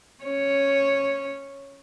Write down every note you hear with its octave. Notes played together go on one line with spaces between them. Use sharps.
C#4 C#5